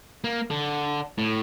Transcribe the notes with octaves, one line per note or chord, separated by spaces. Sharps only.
A#3
D3
A2